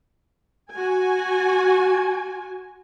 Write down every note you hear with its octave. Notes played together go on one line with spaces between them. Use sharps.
F#4 G#5